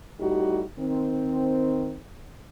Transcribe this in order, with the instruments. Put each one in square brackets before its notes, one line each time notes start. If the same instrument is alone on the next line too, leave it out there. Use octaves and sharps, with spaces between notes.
[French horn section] A2 G3 D#4 F#4 G4
D#3 C4